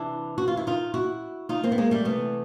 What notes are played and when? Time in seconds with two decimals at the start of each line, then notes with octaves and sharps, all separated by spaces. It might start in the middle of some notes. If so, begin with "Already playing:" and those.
Already playing: C3 E3 D4 E4
0.38 F#4
0.48 F4
0.57 E4
0.67 D#4 F4
0.94 E4 F#4
1.49 D#4 F4
1.63 A#3 C4
1.72 B3
1.78 G#3 A#3
1.91 G3 A3
2.05 C3 E3 A3 B3